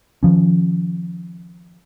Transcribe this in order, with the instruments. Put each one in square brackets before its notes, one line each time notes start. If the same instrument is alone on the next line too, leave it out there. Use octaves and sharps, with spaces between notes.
[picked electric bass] D#3 F3 C#4